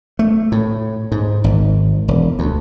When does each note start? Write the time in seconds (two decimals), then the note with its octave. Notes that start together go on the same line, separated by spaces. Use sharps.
0.19 A3
0.52 A2
1.12 G#2
1.44 G#1
2.08 E1
2.39 D2